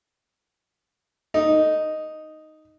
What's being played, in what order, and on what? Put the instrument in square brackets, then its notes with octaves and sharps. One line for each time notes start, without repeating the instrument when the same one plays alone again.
[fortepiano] D#4